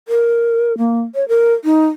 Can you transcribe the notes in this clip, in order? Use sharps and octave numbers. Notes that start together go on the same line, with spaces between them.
A#4
A#3
C#5
A#4
D#4